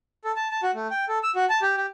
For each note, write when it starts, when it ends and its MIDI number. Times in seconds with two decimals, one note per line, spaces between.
0.25 0.32 69
0.36 0.48 81
0.51 0.61 81
0.63 0.71 66
0.75 0.87 57
0.91 1.05 79
1.09 1.18 69
1.23 1.31 88
1.36 1.45 66
1.50 1.60 81
1.62 1.77 67
1.77 1.86 67